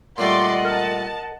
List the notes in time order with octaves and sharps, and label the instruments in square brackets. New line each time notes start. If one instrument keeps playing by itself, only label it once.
[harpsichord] A#2 G3 A3 [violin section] D5 C6 [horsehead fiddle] D#5 F#5
[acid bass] A#4 [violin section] A5